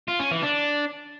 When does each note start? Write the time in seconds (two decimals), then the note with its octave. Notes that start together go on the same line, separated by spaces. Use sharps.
0.08 F4
0.19 C#4
0.31 E3
0.43 D4